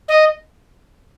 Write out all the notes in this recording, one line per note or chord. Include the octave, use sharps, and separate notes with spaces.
D#5